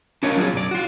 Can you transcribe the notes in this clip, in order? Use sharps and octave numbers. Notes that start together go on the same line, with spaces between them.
C#4 D4 F4 A#4 C#5 D#5
F#3 F4 G#4
B1 F#2 D5
F4 F#4